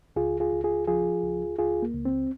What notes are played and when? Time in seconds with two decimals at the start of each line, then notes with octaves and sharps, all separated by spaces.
0.16 C#2 F4 G#4
0.40 F4 G#4
0.53 C#2
0.64 F4 G#4
0.88 F3 F4 G#4
1.24 C#2
1.58 C#2 F4 G#4
1.82 A#3
1.94 C#2
2.05 C4